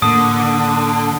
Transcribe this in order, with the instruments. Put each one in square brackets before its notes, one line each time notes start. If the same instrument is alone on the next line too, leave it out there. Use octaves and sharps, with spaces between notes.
[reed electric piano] A2 A#3 [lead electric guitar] D3 [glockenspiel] D#6